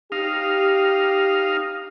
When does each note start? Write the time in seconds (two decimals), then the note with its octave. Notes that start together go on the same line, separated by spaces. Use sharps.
0.12 D#4 G4 F5